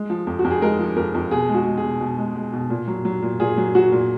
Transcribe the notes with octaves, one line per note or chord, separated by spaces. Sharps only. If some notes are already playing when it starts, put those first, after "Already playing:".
Already playing: G#3
F3
F2
F#4
F2
G#4
G#3 A#4
F3
F2 A#4
F2
B2 G#4
G#3
F#4
G#3
G#4
B2
B2
G#3
G#3
B2
A#2
F#3
F#3
A#2
A#2 G#4
F#3
F#3 F#4
A#2